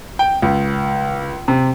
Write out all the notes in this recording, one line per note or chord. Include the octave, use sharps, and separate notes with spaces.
G5
C#2
C3